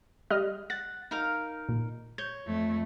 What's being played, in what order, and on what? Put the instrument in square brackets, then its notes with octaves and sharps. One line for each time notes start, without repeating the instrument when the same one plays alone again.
[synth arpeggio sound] G3 D#5 F6
[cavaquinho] F#5 [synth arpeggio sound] A6
[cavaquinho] D#4 A#4 F5
[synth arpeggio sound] A#2
[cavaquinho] C#5 [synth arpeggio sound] G6
[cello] F2 A3